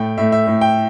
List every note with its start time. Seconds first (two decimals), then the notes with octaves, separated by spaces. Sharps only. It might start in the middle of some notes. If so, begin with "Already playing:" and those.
Already playing: A2 A3 G5
0.18 A2 A3 E5
0.32 E5
0.47 A2 A3
0.61 G5